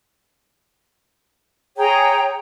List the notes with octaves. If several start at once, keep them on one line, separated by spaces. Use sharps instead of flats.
G#4 C#5 G5 A#5